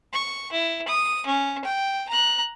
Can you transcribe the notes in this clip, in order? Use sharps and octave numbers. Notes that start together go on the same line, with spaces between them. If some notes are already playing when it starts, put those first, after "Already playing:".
C#6
E4
D#6
C#4
G5
A#5 F#6